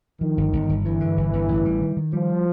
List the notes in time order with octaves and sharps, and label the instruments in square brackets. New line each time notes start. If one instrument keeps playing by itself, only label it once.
[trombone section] D#3 [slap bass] F3
[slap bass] G1
G1
G1
[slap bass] G2 [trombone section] E3
[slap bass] D3
G1
G1
A1
G3
D#3
D#3
[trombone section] F3 [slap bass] G3